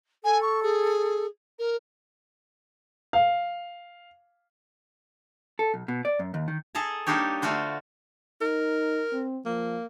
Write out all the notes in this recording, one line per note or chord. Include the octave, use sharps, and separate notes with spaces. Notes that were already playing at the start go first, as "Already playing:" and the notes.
A4 G#5
C#6
G#4
A#4
F5
A4
B1
B2
D5
F#2
D#2
D#3
G#4 A4 D#5 A5 A#5
G3 A#3 D4 D#4 G4 C#5
D3 A3 F4 F#4 C5
D#4 A#4
C4
F3 A#3